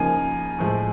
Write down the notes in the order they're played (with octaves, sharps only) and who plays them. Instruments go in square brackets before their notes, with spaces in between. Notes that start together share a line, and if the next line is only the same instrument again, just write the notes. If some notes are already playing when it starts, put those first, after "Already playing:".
Already playing: [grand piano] C#3 F3 A#3 D#4 [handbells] G#5
[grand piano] A2 F3 G#3